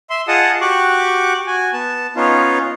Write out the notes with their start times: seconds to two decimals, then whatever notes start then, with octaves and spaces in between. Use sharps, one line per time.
0.10 E5 C6
0.28 F4 G#4 D#5 F#5 A5 D#6
0.61 F#4 G4 C#6 D6 F#6
1.47 F#4 G#5
1.73 B3 A5
2.16 B3 C#4 D#4 F4